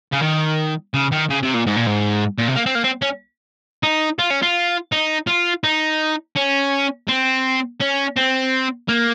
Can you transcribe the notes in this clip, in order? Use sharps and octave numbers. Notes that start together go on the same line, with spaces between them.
C#3
D#3
C#3
D#3
C#3
C3
A#2
G#2
A#2
G#2
A#2
C3
A#3
C4
A#3
C4
C#4
D#4
F4
C#4
F4
D#4
F4
D#4
C#4
C4
C#4
C4
A#3